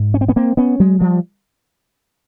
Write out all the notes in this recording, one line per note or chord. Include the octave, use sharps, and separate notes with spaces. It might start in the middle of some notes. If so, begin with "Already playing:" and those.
Already playing: G#2
C#4
C4
B3 C#4
A#3 C4
B3 C#4
F#3 G#3
F3 G3